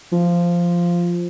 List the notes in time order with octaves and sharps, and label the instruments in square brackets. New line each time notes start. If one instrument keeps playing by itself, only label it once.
[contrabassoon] F3